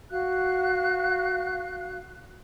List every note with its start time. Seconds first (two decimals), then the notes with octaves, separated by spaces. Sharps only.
0.10 F#4 F5 F#6